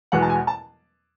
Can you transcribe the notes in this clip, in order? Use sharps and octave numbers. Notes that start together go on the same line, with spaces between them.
E2 B2 G#3 B3 F#5
A5
G#5
A5